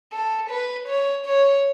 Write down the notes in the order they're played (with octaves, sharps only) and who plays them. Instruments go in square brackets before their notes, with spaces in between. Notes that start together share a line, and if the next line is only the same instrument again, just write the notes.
[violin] A4
B4
C#5
C#5